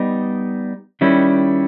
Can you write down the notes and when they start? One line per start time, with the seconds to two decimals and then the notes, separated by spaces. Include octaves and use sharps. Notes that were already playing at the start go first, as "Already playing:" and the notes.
Already playing: G3 B3 D#4
1.01 D#3 G3 C#4 E4